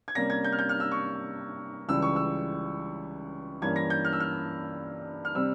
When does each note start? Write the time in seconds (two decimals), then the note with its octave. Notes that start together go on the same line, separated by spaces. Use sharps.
0.08 G#6
0.15 C3 G3 A#3 C#4 A#6
0.30 G#6
0.44 G6
0.52 F6
0.59 G6
0.69 F6
0.80 E6
0.92 C#6
1.88 C#2 C#3 E3 G3 E6
2.02 C#6
2.16 E6
3.62 G2 E3 A#3 C#4 G#6
3.76 A#6
3.90 G6
4.05 F6
4.13 E6
4.20 F6
5.25 F6
5.35 C3 G3 C4 E6